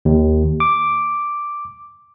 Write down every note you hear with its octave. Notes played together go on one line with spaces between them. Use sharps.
D#2
D6